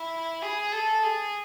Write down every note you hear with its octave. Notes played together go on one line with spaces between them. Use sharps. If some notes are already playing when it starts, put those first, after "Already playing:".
Already playing: E4
G#4
A4
G#4